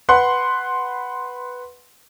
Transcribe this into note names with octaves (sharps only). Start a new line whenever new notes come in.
B4 F#5 C6